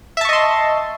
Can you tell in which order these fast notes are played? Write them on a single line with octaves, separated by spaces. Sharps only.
E5 A5 C#6 D#5 C6